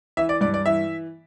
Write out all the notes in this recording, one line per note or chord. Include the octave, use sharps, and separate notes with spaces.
E3 E5
D5
G2 D5
D5
E3 E5